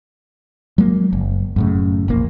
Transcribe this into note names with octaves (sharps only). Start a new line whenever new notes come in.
F#3 G#3 A#3
F#1
F#2 A2 C#3
E1 A#1 A#3